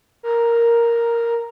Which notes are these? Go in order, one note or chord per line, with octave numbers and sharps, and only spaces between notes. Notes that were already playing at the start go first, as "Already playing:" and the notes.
A#4